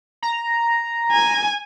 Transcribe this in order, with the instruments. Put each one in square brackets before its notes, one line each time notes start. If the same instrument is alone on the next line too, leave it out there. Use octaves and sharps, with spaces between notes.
[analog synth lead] A#5
[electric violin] G#5